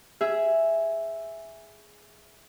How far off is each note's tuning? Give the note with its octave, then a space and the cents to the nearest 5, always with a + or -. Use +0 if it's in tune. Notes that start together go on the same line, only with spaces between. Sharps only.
G#4 +0 E5 +0